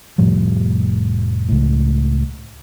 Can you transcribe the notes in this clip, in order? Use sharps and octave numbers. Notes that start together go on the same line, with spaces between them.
F1 A2 F3 G3
C#2 A2